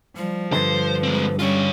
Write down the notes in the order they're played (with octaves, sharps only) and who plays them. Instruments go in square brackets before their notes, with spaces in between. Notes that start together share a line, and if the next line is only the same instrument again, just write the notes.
[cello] F3 [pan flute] G3
[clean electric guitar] G2 D3 [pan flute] B4 [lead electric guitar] C5
[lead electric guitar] G#3 C4
[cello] G3 [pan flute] C#4 [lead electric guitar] F4 C#5